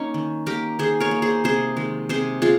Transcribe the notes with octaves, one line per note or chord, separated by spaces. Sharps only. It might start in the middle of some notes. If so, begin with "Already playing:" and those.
Already playing: A#3 C#4 D#4
D#3
A#3 G4 A#4
D#3 G#4 C5
A#4 C#5
A#3
G#4 C5
C3 G#4 C5
D#3 G#3
C3 G#4 C5
G#3 F4 G#4